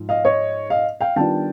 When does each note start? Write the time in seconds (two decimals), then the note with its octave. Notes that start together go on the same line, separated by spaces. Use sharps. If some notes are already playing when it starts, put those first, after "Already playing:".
Already playing: G#2 F3
0.09 D#5 F5
0.25 C#5 D#5
0.70 D#5 F5
1.01 F5 G5
1.16 D#3 G3 B3 D4 F4 G5 A5